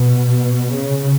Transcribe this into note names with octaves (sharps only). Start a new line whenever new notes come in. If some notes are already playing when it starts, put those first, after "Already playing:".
Already playing: B2
C#3